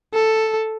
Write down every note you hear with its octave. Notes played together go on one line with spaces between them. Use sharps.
A4